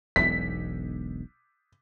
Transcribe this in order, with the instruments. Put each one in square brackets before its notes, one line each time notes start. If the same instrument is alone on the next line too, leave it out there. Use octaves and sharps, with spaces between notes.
[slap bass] E1 B1 G#2 [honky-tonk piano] B6